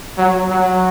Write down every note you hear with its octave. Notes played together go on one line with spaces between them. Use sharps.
F#3
F#3